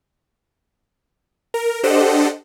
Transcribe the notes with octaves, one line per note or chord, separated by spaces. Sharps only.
A#4
D4 G4 A4 C5 D#5 F#5